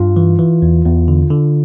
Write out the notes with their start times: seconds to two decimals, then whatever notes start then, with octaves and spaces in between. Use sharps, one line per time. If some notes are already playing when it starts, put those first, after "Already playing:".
Already playing: G2 F4
0.16 E3
0.39 E3
0.62 E2
0.85 E2
1.08 D3
1.31 D3